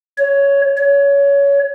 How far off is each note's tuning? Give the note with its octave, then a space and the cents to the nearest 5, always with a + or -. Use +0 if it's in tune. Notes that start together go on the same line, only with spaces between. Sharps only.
C#5 +10
C#5 +20